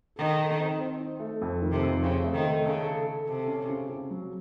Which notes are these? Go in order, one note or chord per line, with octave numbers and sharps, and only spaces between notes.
D#3 A4
A4
C4
C4
D#4
A3
F2
D#3
C3
F2
C#3 C4
A3
D#3
A3
C#3 A4
A4
A4
C3 A4
C#4
C#3
C#3
F#3